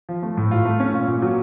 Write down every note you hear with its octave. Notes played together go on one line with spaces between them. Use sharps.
F3
A3
A2
F4
A3
C#4
A#2
A#2
F#3